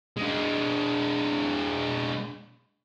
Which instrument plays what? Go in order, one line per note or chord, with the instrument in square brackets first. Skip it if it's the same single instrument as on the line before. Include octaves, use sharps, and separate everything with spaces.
[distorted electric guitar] G#3 D4